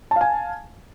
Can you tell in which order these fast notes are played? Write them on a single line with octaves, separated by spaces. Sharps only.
A5 F5 G#5